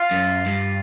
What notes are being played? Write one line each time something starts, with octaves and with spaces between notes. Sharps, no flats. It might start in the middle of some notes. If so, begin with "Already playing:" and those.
Already playing: F4
F#2
G2